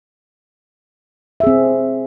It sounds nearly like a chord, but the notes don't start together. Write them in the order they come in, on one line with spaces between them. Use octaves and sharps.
E5 G#4 C4